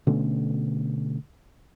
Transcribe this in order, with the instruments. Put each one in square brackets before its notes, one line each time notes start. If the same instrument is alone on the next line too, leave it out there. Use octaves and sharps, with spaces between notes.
[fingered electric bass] B2 D3 A3 C#4